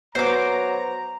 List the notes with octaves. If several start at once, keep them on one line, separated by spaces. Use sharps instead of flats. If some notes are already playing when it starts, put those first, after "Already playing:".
F#3 B3 C5 A#5 D6